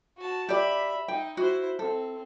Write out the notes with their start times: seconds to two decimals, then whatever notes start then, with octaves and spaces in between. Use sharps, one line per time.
0.18 F#4 A5
0.49 G4 D5 E5 B5
1.08 D#4 G5
1.37 E4 F#4 C5
1.79 C4 A4